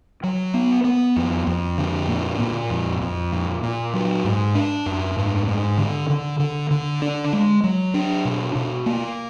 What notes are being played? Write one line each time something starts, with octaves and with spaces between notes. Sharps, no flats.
F#3
B3
B3
F2
F2
D3
A#2
A#2
F2
F2
A#2
A#2
F#3
G#2
D4
F#2
G#2
G#2
D3
D3
D3
D3
D4
G#3
F#3
D4
B2
B2
A#3